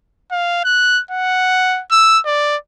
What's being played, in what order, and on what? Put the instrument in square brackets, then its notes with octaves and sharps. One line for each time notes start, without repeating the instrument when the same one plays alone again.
[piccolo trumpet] F5
F#6
F#5
E6
D5